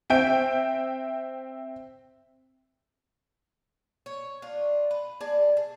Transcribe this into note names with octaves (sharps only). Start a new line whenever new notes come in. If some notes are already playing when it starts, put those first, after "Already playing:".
C4 E5 G5 G6 D7
C#5
D4 F4
B4
G#4 D5 A5
G#4